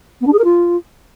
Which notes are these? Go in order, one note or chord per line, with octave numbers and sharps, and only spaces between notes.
B3
D4
G#4
A#4
F4